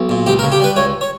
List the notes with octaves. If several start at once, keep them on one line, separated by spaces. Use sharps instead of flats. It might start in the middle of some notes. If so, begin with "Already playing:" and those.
Already playing: B1
A#2
C#2 G4
A#4
C#3
G4
G3 B4
C#2 C#5
C#5